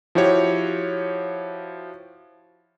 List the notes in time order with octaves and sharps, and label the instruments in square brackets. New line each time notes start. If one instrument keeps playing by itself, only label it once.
[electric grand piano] F3 E4 F#4 G4 C#5